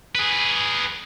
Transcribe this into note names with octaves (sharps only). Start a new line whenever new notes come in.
G#4 B4